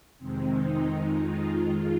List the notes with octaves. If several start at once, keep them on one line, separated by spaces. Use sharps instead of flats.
F2 C3 D#3 G#3 C4
D#4
F2 D#3 G#3 D#4
F4
F2 D#3 G#3